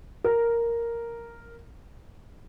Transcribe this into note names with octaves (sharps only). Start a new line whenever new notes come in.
A#4